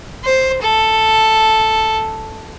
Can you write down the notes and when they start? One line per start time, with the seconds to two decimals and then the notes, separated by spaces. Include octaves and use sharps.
0.25 C5
0.62 A4